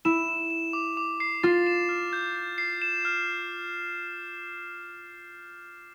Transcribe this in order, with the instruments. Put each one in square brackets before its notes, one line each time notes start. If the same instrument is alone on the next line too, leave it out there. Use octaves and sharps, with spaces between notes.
[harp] E4 [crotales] E7
[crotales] E7
E7
D6
D6
C7
[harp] F4 [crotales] A6
[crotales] E7
F6
G6
C7
C7
E7
F6